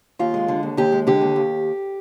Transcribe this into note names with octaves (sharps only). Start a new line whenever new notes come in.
D#2 F4
G#3
D3
D#2
D#2 G4
G#3
D3 G4
D#2
D#2